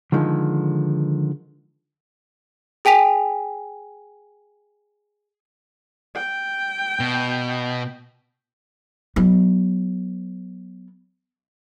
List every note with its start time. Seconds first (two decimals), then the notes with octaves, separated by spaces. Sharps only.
0.12 D3 D#3 F3 G#3
2.85 G#4 G5 G#5 B6 F7
6.15 G5
7.00 B2
9.16 F#3 B3